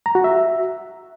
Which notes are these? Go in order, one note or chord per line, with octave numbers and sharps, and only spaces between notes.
A#5
F#4
E5